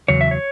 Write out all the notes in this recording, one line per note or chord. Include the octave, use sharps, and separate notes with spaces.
E2 C#3 F#3 C#5
E5
C#5